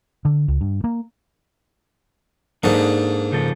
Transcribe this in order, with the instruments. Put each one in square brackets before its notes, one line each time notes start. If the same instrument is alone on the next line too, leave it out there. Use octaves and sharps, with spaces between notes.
[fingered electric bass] D3
C#2
G2
A#3
[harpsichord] G#2 A#3 [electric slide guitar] D4 D#4 A4
[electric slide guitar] C#3 F3 A4